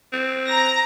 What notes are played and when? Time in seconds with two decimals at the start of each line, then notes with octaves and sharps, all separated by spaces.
0.13 C4
0.49 A#5 A#6